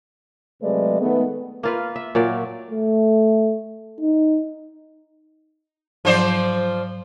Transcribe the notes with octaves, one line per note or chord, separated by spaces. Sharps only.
C3 F#3 G#3 A3 B4 D5
D#3 G#3 A3 B3
A#3 F4 B4
E5
A#2 F#3 D5
A3
D#4
G#2 F3 F#3 C5 D5